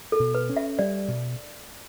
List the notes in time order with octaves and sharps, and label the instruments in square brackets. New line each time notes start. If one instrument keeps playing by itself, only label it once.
[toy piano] A4
[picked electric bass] B2
[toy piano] B4
[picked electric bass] C#4
[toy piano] E5
[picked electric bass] G3 [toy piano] D5
[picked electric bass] B2